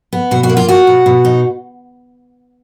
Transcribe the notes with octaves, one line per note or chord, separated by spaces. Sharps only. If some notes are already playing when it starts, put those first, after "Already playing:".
B3
B2 F#4
F#4
A#3
F4
F4 F#4
B2
B2
D#4